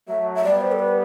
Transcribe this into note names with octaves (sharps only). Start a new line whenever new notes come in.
F#3 A3 E5
E5
G3 B3 D5
C5
A4
B4